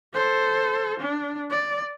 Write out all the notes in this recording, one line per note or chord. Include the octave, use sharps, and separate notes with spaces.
A4 C5
D4
D5